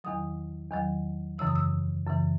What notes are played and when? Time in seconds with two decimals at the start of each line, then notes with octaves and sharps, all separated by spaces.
0.04 E2 D#3 F#3 D#6
0.71 E2 D#3 F#3
1.38 F#2 C#3 E3 E6
1.47 D#6
1.56 E6
2.06 F#2 C#3 E3